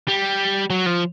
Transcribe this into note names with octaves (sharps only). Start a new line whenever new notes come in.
G3
F#3
F3